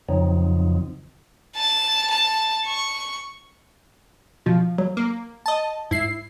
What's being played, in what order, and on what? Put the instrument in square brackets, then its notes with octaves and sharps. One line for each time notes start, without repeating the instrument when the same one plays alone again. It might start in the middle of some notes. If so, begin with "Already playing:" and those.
[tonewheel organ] F2 C#3 F3 F#3 C4 D#4
[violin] A5
A5
C#6
[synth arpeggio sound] B2 [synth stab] F3
[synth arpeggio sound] F#3
[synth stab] A#3
D#5 A5
[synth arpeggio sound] G#2 [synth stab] E4 C7